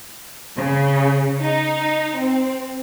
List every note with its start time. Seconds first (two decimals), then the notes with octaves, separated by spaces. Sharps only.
0.57 C#3
1.40 D#4
2.17 C4